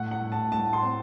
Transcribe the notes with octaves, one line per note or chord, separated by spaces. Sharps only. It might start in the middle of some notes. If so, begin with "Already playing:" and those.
Already playing: A2 F#5
F#5
A2
A5
A2 A5
C6
C4